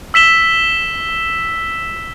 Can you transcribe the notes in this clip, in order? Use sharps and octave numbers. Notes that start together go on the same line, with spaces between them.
E6 B6 E7 G7